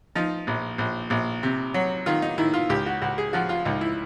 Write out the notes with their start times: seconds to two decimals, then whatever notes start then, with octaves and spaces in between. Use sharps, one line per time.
0.15 F3 D#4
0.47 A#1
0.78 A#1
1.10 A#1
1.43 C3
1.74 F#3
2.06 D#3 F4
2.22 D#4
2.38 D#3 E4
2.53 F4
2.69 C#2 G4
2.86 F#4
3.02 C#2 F#4
3.18 G#4
3.33 F3 F#4
3.49 F4
3.65 C#2 D#4
3.81 E4